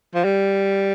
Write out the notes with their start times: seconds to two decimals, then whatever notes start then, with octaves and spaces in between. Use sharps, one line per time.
0.15 F3
0.25 G3